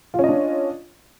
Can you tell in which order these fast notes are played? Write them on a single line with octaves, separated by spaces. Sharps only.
F4 C#4 D#5 D4